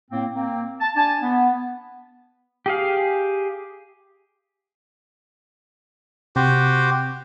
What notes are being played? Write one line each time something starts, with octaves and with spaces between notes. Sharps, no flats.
A2 A#3 C4
A#3 C4
A5
D4 G#5 A5
B3
G4 G#4 F5
C3 F#4 G4 C5